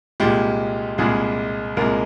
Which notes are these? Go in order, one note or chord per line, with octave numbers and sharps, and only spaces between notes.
C2 A#2 G#3 G4
C2 A#2 G#3 G#4
C2 A#2 G#3 A#4